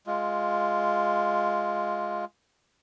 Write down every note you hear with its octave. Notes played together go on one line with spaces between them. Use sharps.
G#3 F4